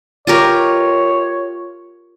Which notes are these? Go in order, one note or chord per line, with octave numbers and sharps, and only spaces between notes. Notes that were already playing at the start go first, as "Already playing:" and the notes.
F4 G4 A#4 C#5